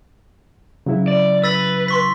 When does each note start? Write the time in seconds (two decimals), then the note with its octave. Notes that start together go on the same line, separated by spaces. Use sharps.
0.86 C#3 F#3 E4
1.08 D5
1.43 B4 E6 A6 B6
1.88 C6 C#6 B6